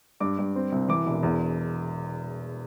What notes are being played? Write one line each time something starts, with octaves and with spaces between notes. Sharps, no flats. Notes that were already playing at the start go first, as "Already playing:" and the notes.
G2 D6
G2
C4
C2
E3 D6
E1
E2